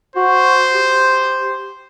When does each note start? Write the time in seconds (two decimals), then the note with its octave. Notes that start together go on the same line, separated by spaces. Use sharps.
0.16 F#4 C5
0.74 G4